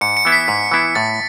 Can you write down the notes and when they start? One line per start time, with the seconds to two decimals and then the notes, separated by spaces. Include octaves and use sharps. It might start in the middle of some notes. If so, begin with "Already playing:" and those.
0.01 G#2 C#7
0.17 C#7
0.25 E3 B3 E4
0.32 B6
0.48 G#2
0.71 E3 B3 E4
0.95 A2 A6